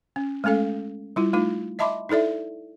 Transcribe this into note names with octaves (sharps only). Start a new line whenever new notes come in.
C#4
G#3 A3 C#4 A4 F5
G3 E4 F4
A3 D#4 F4
D#5 E5 A5 B5 C6 D6
D#4 E4 A4 D5 E5